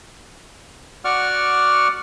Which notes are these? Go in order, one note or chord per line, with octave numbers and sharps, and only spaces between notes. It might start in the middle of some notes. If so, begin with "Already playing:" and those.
F#4 D5 F#5 C#6 D6 F6